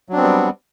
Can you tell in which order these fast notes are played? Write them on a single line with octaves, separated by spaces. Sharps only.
F#3 D4 C4 B3 G3